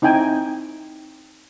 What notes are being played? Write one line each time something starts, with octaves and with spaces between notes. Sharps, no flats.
C4 D#4 E4 G5 G#5